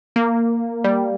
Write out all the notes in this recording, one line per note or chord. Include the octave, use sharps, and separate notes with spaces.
A#3
G3